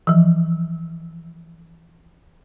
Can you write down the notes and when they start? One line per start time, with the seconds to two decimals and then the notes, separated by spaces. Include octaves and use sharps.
0.07 E3 F3